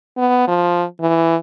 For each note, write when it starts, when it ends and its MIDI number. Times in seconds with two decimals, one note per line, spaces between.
0.18 0.46 59
0.48 0.84 53
1.01 1.36 52